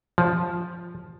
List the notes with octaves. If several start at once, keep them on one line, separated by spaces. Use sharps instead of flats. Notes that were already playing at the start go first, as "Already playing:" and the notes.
F3